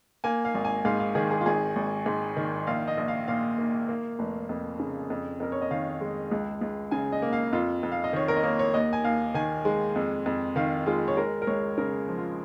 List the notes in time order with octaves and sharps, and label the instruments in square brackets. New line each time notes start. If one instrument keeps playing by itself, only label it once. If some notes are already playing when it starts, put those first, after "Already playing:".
[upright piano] A#3 G#5
F5
G#1
G#5
G#2 F5
F5
D#3 G#4
G#4
F4
G#1 G#4
G#1
G#2
D#3
A#1 F5
D#5
A#1
F5
A#2 F5
A#3
A#3
F1
F2
C#3
F2
F2 A#4
C#5
D#5
D#3 F5
G#3
C#2
C#2
C#3 G#5
D#5
A#3
F5
F2 F4
F2
F5
D#5
D#3 C#5
A#4
D#5
A#3 C#5
C#5
D#2 D#5
G#5
D#2 F5
D#3 G#5
G#3
F2
F2
D#3 F5
G#3 F4
C#5
G#3 A#4
A#4
C#2 C#5
C#3 A#4
F3
F4